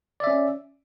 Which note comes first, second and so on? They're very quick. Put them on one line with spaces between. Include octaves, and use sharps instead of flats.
D5 E5 C#4